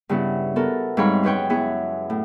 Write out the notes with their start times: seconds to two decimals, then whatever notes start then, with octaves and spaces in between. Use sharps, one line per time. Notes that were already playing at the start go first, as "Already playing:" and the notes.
0.09 G2 C#3 B3 E4
0.56 B3 F#4 A4 A#4
0.97 G#2 G3 C4 C#5 F5 B5
1.23 F#2 B4 C#5 G5
1.50 B3 E4 G#4 C#5
2.10 A2